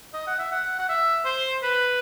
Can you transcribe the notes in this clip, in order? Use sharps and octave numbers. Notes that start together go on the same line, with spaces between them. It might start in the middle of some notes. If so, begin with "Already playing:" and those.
D#5
F#5
E5
F#5
F#5
E5
C5
B4